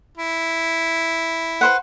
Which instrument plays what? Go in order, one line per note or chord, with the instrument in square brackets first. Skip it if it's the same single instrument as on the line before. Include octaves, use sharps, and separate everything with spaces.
[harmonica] E4
[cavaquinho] B4 C5 F#5